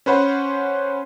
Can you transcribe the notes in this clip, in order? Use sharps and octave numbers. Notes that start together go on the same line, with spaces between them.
C#4 B4 C5 F#5